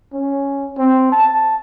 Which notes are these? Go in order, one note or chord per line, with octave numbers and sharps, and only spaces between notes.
C#4
C4
A5